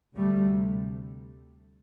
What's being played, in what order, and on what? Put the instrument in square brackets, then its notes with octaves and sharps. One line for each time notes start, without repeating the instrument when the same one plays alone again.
[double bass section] D2 C3 G3 A3